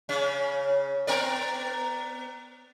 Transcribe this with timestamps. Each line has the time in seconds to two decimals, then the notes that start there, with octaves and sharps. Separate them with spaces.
0.09 C#3 C#4
1.07 B3 A#4 D5